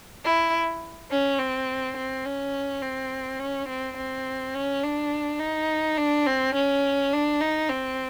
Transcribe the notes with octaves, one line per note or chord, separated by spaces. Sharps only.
E4
C#4
C4
C4
C#4
C4
C#4
C4
C4
C#4
D4
D#4
D4
C4
C#4
D4
D#4
C4